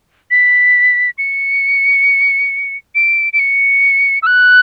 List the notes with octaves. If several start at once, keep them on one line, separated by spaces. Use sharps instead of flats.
B6
C#7
D7
D7
C#7
E6
F#6